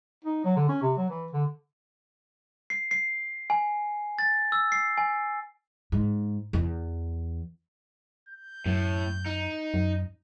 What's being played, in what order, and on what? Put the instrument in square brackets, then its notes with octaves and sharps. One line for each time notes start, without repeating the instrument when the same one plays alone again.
[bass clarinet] D#4
F#3
D3
C#4
C3
F#3
E3
D3
[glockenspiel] C7
C7
G#5
A6
E6
C7
G#5
[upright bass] G#2
E2
[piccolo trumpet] G6
[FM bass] F#2 [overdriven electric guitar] A2
[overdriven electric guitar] D#4
[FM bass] F#2